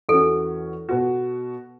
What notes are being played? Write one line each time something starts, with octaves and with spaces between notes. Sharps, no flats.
E2 E3 C#4 F#4 A4
B2 B3 F#4